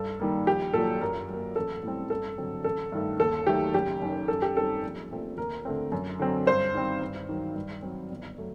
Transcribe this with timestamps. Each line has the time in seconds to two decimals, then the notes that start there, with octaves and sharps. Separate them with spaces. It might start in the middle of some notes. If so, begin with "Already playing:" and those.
Already playing: G2 A4
0.19 D#3 G3 A#3
0.47 A#1 G4
0.74 A#2 F#3 A4
1.01 F#2 A#4
1.29 F#3 A#3
1.56 A1 A4
1.83 A2 G3 C4
2.10 G2 A4
2.38 D3 F#3 C4
2.64 A1 A4
2.92 G2 D#3 A3
3.20 D#2 A4
3.47 D#3 F#3 A3 G4
3.73 F#1 G4
4.02 F#2 D#3
4.28 F#2 A4
4.42 G4
4.56 D#3 G3 C4 A4
4.83 A#1
5.11 A#2 A3 C4
5.37 D#2 A#4
5.65 D3 A3 C4
5.92 F#2
6.19 D3 F#3 C4
6.47 G2 C5
6.74 D#3 G3 C4
7.02 G2
7.29 D#3 F#3
7.55 G2
7.82 F#3 C4
8.11 G1
8.38 F#3 A3